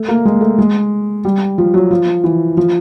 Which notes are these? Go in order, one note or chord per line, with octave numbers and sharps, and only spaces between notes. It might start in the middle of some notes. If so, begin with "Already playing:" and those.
Already playing: A3
A#3
G#3
A3
G#3
G3
F3
F#3
F3
E3
F3